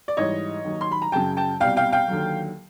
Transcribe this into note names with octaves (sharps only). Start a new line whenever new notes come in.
D5
G#2 E3 G3 C#5 D#5
D#2 D#3 F#3
C6
B5
A#5
F#2 C#3 F#3 G5 A5
G5 A5
C2 B2 G3 F5 G5
F5 G5
F5 G5
D#2 D3 F#3